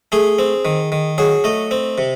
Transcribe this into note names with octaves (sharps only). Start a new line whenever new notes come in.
A3 G#4
C4
D#3
D#3
F#3 G#4
A3 D#5
C4
C3